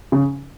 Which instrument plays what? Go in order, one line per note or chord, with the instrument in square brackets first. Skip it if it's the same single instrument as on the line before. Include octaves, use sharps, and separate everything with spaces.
[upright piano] C#3